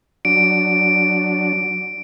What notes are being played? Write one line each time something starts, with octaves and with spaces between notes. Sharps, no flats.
F#3 D4 D7